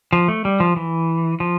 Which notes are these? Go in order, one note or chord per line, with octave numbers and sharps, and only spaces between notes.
F3
A3
G3
F3
E3
F3